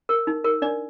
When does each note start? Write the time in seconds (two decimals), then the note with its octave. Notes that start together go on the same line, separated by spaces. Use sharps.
0.09 A#4
0.27 D#4
0.44 A#4
0.62 D4 D5